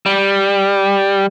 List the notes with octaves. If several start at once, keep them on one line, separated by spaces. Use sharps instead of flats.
G3